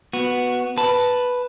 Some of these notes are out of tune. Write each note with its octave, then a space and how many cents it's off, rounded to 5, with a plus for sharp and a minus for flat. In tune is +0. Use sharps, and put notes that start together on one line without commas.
B3 +0 F#4 -10
B4 +0 A5 +0